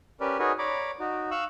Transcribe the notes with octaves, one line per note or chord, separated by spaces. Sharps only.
C#4 G4 A#4 B4 D5
D#4 F#4 G#4 A#4 B4 C#5
C#5 D5 A#5 B5 D6
D#4 F#4
F5 C#6 E6 F#6